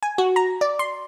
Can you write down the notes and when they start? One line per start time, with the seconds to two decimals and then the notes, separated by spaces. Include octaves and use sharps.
0.03 G#5
0.18 F#4
0.36 A#5
0.61 D5
0.79 C6